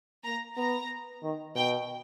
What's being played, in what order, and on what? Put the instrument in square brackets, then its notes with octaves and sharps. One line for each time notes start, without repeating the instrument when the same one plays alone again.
[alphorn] A#3 [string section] A#5
[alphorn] B3 [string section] A#5
[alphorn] D#3
[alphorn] B2 [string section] G5